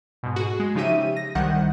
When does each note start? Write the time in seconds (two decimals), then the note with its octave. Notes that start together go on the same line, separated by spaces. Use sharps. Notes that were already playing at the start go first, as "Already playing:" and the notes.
0.23 G#2 B2
0.36 F#4 G#4
0.60 G#3
0.75 C#3 F3 D#4 G4 E5 D#7
1.17 A#6
1.35 C2 D#3 G3 F#5 G6